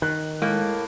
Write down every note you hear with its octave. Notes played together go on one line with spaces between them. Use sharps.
D#3 F#6
A2 G#3 A#3